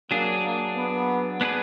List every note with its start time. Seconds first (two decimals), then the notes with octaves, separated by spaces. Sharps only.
0.10 F#3 A#3 D4 G#4
0.43 A#3
0.76 B3
1.41 B3 D4 G#4 B4